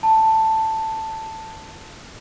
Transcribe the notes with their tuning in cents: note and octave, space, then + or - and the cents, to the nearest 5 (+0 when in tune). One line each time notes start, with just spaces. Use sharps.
A5 +5